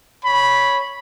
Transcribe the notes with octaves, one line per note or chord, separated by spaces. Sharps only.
C#5 B5